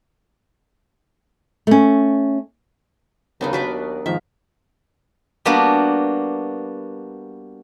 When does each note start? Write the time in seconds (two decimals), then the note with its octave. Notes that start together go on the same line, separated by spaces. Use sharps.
1.67 A3 C#4
3.41 D#2 C#3 F#3 B3 D4 D#4 A#4
3.53 D4 F#4 B4 D6
4.06 G#2 D#3 F3 E5 F5
5.46 G3 A#3 B3 D4 F#4